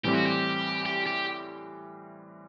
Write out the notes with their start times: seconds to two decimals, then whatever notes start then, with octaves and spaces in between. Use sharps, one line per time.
0.04 A2 E3 G3 C4 G4
0.15 F#4
0.26 G4
0.86 G4
1.06 G4